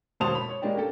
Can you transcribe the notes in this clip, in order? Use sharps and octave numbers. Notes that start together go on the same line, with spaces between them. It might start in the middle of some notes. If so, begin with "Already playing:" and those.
E1 D#2 C5 A5 D#6 F7
B5
C#5
G#3 A#3 D4 G4
A#3 C#4 G4 A4